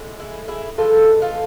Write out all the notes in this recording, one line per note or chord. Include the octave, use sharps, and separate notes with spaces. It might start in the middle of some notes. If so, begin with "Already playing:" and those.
Already playing: A2 G#3
E4 G#4
E4 G#4
A2 E3 G#3 F4 A4
F4 A4